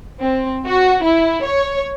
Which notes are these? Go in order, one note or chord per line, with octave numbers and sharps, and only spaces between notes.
C4
F#4
E4
C#5